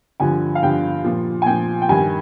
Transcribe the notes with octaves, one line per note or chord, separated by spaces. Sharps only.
G2 D3 F3 G#5
F5
G2 D3 F3 G5
A#2 F3
G#5
A#2 F3 G5
G5
G2 D#3 G#5